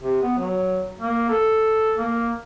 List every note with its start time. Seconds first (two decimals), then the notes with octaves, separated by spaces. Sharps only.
0.03 C3
0.22 B3
0.38 F#3
1.01 A#3
1.30 A4
1.98 A#3